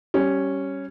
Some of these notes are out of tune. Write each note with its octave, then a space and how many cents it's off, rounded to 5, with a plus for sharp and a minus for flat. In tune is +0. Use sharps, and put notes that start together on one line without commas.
G3 -15 C#4 -5